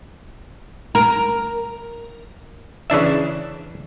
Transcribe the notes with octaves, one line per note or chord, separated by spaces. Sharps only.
A#4
C#3 E3 D4 E5